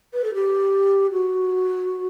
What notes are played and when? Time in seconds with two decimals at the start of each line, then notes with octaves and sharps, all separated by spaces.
0.13 B4
0.24 A4
0.34 G4
1.11 F#4